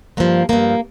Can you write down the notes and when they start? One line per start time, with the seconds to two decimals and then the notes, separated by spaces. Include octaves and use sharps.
0.17 G2 F3 A#3
0.49 G2 F3 A#3